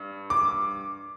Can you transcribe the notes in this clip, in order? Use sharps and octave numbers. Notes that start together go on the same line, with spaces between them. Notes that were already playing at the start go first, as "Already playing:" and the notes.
Already playing: G2
D6